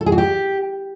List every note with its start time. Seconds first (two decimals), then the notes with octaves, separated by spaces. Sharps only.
0.01 A4
0.06 G#4
0.12 F#4
0.18 G4